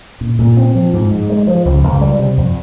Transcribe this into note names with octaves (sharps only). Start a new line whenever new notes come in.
A#2
A#2
C4
F3
G#2
G#2
G#3
F3
C#2
C#2
G3
C3
F2